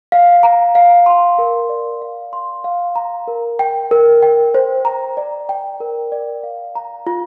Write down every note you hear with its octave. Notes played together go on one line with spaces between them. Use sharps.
F5
A#5
F5
C6
A#4
D5
F5
C6
F5
A#5
A#4
G5
A#4
G5
C5
A#5
D5
G5
A#4
D5
F5
A#5
F4